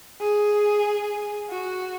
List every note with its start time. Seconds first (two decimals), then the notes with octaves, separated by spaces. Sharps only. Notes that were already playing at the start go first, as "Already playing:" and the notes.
0.21 G#4
1.50 F#4